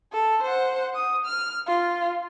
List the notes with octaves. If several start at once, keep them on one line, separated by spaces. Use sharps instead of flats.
A4
C5 F#5
D#6
F6
F4